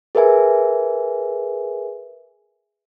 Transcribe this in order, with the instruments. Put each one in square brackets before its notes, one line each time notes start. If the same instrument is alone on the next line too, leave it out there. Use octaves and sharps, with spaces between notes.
[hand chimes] G#4 A#4 B4 E5 G#5